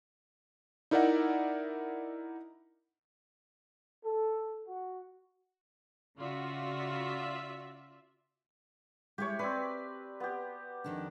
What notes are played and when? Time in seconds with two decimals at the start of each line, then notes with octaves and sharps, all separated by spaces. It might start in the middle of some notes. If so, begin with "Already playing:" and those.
0.91 D#4 E4 A#4 D5 E5 F#5
4.05 A4
4.66 F#4
6.18 C#3 F4 F#4 D5 E5
9.18 G#3 E4 G4 C#5
9.39 C4 B4 D5
10.20 B3 G4
10.84 F2 D#3 D4